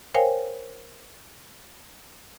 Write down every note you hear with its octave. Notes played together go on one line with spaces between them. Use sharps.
A#4 C5 C#5 F5 G5 G#5